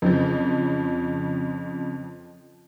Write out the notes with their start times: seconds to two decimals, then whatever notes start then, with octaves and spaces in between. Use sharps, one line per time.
0.02 F2 C#3 F3